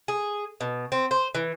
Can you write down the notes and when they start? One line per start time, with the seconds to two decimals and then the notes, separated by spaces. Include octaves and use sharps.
0.08 G#4
0.61 B2
0.92 C4
1.11 C5
1.35 E3